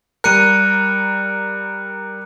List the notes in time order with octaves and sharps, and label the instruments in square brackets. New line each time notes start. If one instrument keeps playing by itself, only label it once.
[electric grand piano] G3 A#4 [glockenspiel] F#6 C#7 D#7